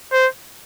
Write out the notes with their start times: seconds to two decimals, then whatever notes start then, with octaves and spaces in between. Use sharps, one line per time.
0.12 C5